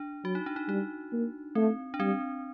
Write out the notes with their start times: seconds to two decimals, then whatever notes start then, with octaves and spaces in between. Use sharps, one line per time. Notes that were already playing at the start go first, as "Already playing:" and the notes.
Already playing: D4
0.25 F#3 F#4
0.35 D#4
0.46 D4
0.56 D#4
0.69 G3 D#4
1.13 A#3
1.55 A3 C4
1.94 D4
2.00 G3 C4